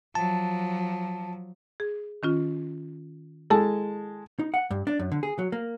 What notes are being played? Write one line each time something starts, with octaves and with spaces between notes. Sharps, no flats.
F3 F#3 A5
G#4
D#3 C#4 F4
G#3 E4 A4 A5
D#4
F#5
G2
D4
F#2
D3
G#4
F#3
A#3